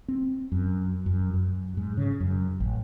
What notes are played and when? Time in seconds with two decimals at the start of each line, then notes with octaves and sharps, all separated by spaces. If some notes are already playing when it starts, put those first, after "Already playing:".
0.08 C4
0.52 F#2
1.06 F#2
1.34 F#2
1.77 G#2
1.97 C#3
2.20 F#2
2.60 A1